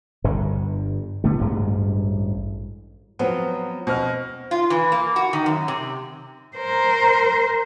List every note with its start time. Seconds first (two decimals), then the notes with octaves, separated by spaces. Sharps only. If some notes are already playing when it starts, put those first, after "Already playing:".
0.24 G1 G2 D3
1.24 D3 A3 B3
1.39 A1 D2 G2 G#3
3.19 F3 F#3 B3 C4
3.87 B2 C4 F6
4.51 F4
4.70 E3
4.92 A#3
5.16 F#4
5.33 D#3
5.46 F#2
5.68 C3
6.57 A#4 C5